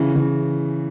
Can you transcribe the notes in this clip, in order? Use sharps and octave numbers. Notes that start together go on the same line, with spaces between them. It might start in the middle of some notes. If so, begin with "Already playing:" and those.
Already playing: C#3 E3
C#3 E3